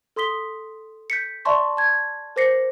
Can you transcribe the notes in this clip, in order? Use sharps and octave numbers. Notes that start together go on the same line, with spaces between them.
A4 C6 D#6 B6 G7
G6 B6 C#7
D5 E5 A5 C6 C#6
A5 G#6
A#4 C5 D6 A#6 C7 C#7